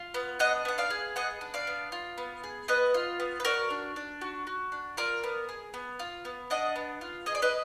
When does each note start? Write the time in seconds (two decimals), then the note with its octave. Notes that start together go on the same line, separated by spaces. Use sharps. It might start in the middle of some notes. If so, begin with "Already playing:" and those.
Already playing: F4
0.14 B3
0.39 D4 D#5 F#5
0.65 B3 F#5
0.78 D5 F5
0.90 G#4
1.16 B3 D#5 F#5
1.41 D4
1.54 D5 F5
1.67 B3
1.92 F4
2.18 B3
2.44 G#4
2.68 B3 B4 D#5
2.94 F4
3.20 B3
3.40 B4
3.45 F#4 A#4 D5
3.70 D4
3.96 D4
4.21 F#4
4.47 F#4
4.72 D4
4.97 F4 A#4 D5
5.24 B3
5.49 G#4
5.74 B3
5.99 F4
6.25 B3
6.50 D4 D#5 F#5
6.76 B3
7.01 F4
7.26 G#4 D#5
7.35 D5
7.42 B4 D#5